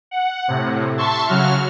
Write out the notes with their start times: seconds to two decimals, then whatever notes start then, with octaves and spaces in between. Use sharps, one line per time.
0.11 F#5
0.48 A2 C3
0.97 E5 A5 C6 C#6
1.27 C#3 F#3 F#4 F6